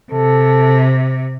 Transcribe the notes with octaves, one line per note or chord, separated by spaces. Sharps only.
C3 A4